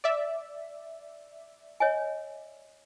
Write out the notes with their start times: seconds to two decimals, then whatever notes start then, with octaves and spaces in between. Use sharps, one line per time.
0.04 D5 E5
1.80 C#5 D#5 G#5